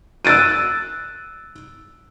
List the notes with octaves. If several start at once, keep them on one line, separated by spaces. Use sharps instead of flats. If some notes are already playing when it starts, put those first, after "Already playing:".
E6 F#6 A6 D7 D#7